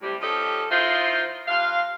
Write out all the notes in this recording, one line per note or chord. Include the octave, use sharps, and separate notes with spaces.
A2 C3 G3
F3 C#4 G4 A4 D#5
D#3 E4 F4 C5
G2 F4 F5